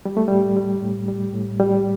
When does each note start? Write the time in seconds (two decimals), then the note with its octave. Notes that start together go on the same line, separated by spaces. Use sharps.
0.05 G3
0.17 A3
0.28 A2 G3
0.57 G3
0.83 A2
1.08 G3
1.34 A2
1.60 G3